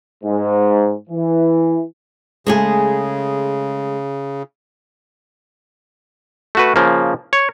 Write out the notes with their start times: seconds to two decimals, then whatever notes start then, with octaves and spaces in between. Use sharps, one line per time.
0.23 G#2
1.09 E3
2.46 C#3 G#3 A3 G#4
6.55 A3 F#4 B4
6.76 C#3 F3 A#3
7.33 C#5